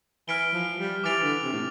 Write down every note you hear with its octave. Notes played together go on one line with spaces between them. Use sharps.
E3 F6 B6 D7 G7
F3
G3
E3 D6 F6 A6 D7 F7
D3
C3
A2